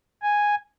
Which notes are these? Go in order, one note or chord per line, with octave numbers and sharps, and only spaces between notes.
G#5